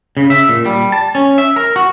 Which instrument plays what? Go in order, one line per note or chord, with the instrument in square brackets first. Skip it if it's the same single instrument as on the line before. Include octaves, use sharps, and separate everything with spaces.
[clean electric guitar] C#3
E5
A#2
G3
A5
C#4
E5
A#4
F#4